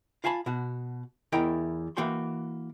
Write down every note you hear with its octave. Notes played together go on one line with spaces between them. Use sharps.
F4 F5 G#5 A5 B5
B2 F#4
E2 E4 A#4 D#5 G5
E3 A#3 F#4 G5 C6